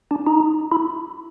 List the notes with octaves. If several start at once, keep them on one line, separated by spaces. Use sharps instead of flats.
D4
D#4
E4